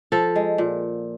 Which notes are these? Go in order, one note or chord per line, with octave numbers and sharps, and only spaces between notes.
F3 A4
G#3
A#2